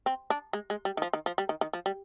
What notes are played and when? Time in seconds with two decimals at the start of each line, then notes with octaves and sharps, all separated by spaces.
0.06 C4
0.30 D4
0.53 G#3
0.70 G#3
0.85 G3
0.97 D#3
1.02 F3
1.13 D#3
1.26 F3
1.38 G3
1.49 D#3
1.61 D#3
1.73 F3
1.86 G3